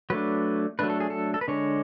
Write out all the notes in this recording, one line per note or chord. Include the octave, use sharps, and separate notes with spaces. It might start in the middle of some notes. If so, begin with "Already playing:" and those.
F#3 A3 D4 B4
F#3 A3 D4 B4
A4
G#4
A4
A4
B4
D3 G#3 D4 C#5